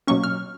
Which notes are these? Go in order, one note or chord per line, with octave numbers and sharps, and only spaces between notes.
B2 F#3 A#3 C#4 C#6
F6